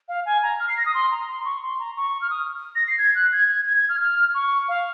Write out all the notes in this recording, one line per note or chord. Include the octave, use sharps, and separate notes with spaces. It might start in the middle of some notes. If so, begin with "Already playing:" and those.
F5
G#5
A#5
F6
C7
A#6
D#6
C6
A#5
C6
C#6
C6
A#5
C#6
F6
D#6
A#6
C7
G#6
F#6
G#6
G#6
G#6
G#6
F6
F6
C#6
F5